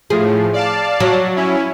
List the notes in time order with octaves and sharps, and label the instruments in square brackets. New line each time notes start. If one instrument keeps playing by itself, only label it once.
[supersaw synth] A2 F3 [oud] G#4
[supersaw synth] D5 F5 A5
[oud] F#3
[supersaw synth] C#4 E4